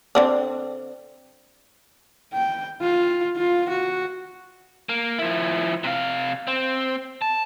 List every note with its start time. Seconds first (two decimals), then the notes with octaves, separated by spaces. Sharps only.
0.15 D3 C4 D4
2.33 G5
2.81 F4
3.37 F4
3.70 F#4
4.89 A#3
5.19 F3 E4
5.84 C3 F5
6.48 C4
7.22 A5